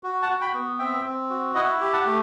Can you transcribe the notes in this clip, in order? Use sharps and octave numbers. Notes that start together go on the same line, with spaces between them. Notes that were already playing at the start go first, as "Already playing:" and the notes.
F#4
F#5 A5
F#4
G5 B5
B3
C4 E5 G5
C4
F#4
E4 D#5 F#5
G4
F#5 A5
A3